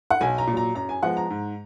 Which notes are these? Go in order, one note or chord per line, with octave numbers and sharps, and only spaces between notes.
F#5
B1 G#5
A#5
A#2
F#3 A#5
F#2 A#5
G#5
F3 G#3 B3 F#5
A#5
G#2